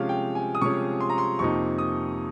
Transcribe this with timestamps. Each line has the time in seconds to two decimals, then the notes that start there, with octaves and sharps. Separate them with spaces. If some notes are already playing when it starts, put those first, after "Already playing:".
Already playing: C3 F3 G#3 C#4 F5
0.09 G5
0.35 G#5
0.55 D#6
0.61 C3 F3 G#3 C#4 C#6
1.01 C6
1.09 A#5
1.18 C6
1.39 F2 C3 F3 A#3 D#4 C#6
1.78 D#6